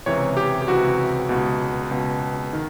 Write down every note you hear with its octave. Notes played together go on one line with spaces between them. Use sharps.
C#2 C3 E3 C#5
G4
G4
C#2 C3 E3 F#4
C#2 B2
C#2 B2
D#3